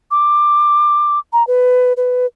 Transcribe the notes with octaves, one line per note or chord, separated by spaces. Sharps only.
D6
A#5
B4
B4